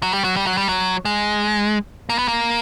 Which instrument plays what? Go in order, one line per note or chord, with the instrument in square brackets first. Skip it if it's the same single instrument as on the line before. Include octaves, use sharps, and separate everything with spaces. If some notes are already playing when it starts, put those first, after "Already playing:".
[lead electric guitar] F#3
G3
F#3
G3
F#3
G3
F#3
G#3
A#3
B3
A#3